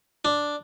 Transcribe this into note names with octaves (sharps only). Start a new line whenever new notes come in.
D4